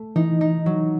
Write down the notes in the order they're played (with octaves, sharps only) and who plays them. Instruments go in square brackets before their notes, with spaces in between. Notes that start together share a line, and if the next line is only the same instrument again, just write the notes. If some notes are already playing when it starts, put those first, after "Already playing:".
Already playing: [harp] A3
[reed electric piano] E3 [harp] D#4
[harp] D#4
F#3